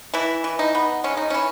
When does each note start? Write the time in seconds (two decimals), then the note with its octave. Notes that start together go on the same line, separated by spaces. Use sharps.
0.14 E3 E4
0.44 E3
0.59 D#4
0.75 B3
1.04 G#3 C#4
1.17 D#4
1.30 E3 C#4